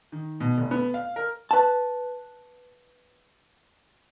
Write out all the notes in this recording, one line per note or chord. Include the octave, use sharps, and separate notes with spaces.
D#3
B2
F1
B3
F5
A#4
B4 A5